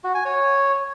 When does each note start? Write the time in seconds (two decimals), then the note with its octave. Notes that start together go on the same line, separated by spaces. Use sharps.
0.04 F#4
0.15 G#5
0.25 C#5